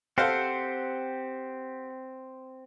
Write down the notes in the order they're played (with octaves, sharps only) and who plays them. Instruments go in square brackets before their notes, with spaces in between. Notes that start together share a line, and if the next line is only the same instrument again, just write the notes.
[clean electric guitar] C4 [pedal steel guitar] G4 F#5 [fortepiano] A4 C5 F5